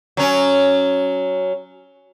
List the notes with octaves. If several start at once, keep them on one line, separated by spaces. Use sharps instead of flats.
F#3 C#4